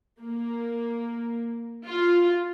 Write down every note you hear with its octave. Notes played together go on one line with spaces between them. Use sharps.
A#3
F4